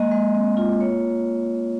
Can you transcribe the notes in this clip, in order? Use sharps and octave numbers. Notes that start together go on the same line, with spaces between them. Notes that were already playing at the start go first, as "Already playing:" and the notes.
Already playing: G#3 A#3 D#5
G#3
C4
F4
A#3 C#5